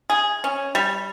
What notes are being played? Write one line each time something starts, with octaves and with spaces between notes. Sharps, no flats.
G#4
C#4
G3